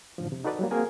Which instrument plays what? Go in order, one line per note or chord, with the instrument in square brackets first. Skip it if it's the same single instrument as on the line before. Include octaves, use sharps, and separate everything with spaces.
[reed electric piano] F#2 A2 D3 F3
C3
D#4 F#4 A4 B4 D5 D#5
F#3 G3 A#3
A#3 C4 F#4 G#4 A#4 G#5